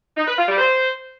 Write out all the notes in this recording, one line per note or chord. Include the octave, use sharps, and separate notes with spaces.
D#4
B4
F4
G3
C5